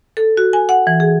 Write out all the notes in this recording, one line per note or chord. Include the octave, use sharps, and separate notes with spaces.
A4
F#4
G#5
F#5
E3
G#4